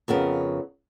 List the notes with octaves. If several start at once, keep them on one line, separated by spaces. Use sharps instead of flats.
F2 C#3 B3 A#4